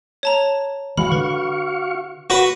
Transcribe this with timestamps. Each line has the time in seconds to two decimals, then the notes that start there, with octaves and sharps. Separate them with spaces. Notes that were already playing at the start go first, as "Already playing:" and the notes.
0.23 C#5 A5 A#5
0.97 E3 G#3 F#4 F5 B5 C#6
1.12 D3 B4
2.30 F#4 B4 A#6